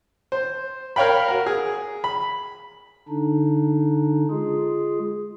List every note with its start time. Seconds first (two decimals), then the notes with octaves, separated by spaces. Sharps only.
0.32 C5
0.96 A#4 C#5 F5 G5 B5
1.28 F#4 A#4
1.46 G#4
2.04 B5
3.09 D3 D4 D#4
4.30 G#3 F4 G#4